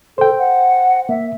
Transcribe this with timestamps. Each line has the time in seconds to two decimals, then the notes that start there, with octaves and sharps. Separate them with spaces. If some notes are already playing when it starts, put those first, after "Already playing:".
0.18 A4 C5 G5
0.38 F#5
1.09 A#3 E5